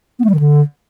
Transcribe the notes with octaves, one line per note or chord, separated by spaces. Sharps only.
B3
A3
G3
D#3
D3